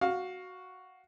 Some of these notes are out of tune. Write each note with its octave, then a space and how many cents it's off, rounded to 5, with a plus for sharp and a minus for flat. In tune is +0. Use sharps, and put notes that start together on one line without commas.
F#4 +0 F5 +15